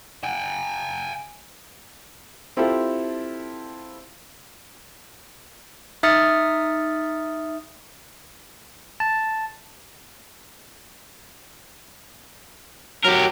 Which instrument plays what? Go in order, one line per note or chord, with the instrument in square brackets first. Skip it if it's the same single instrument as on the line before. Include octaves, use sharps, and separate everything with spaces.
[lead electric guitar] G5 G#5
[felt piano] C4 E4 F4 G4 A4
[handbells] D#4 E5 D#6 F6 A6 C#7
[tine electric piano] A5
[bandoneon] F#3 [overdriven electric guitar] G4 A#4